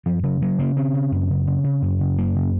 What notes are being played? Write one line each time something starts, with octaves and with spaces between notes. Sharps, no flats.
F#2 F3
C#3 F#3
C#3 F#3
C#3 A#3
C#3 C4
C#3
F#2
C#3
C#3
C#3
F#2
C#3
F#2 A#3
C#3